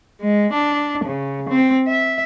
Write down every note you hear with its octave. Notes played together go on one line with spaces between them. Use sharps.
G#3
D4
C#3
C4
E5